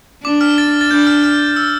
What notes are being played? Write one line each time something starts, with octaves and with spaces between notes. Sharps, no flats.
D4 D6
F6
A6
A6
D4 G6
F6
F6
E6